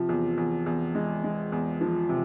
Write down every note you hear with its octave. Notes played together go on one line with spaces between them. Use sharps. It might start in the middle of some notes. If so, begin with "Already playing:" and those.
Already playing: C3 F3
E2
E2
E2
G#3
G#3
E2
F3
C3